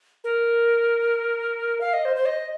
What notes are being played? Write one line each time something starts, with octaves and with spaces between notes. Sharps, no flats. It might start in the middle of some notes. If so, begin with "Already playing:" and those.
A#4
F5
D#5
C5
C5
D#5